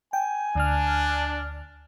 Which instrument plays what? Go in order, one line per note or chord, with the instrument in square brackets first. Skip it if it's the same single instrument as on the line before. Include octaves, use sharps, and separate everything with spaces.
[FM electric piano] G5 [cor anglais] G#5
[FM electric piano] D2 F6 [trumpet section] D4